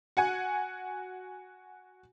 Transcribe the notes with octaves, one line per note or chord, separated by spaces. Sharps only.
F#4 F#5 G#5